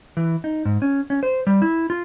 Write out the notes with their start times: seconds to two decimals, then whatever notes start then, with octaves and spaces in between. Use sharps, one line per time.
0.17 E3
0.44 D#4
0.65 G#2
0.82 C#4
1.10 C#4
1.23 C5
1.47 G3
1.62 E4
1.90 F4